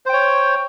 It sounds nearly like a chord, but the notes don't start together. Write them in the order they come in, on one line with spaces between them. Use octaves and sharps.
C5 G5 C#5